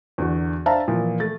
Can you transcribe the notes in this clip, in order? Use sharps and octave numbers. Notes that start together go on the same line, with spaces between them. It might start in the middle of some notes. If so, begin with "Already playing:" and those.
E2 D3 F#4
D4 C5 E5 F5 A5 A#5
A#2 E3 F3
A3 A6